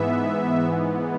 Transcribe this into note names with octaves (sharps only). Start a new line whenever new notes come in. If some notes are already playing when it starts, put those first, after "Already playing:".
Already playing: G#2 E3 B3 E5